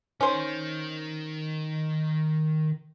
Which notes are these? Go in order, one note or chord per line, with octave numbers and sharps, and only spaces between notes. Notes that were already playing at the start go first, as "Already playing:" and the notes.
D#3 C#4 C5